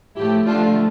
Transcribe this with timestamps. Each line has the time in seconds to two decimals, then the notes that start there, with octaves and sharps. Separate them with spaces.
0.16 A2 F3 A3 E4 G4
0.46 D3 F3 A3 D4 F4